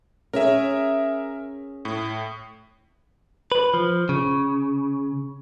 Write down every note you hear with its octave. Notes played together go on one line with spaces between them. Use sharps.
C#4 G#4 A#4 E5
A2
B4
F3
C#3